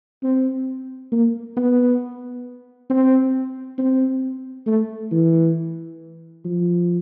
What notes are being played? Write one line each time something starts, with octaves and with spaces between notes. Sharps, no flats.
C4
A#3
B3
C4
C4
A3
E3
F3